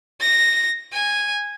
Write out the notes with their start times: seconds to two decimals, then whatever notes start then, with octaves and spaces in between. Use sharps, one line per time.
0.20 A#6
0.93 G#5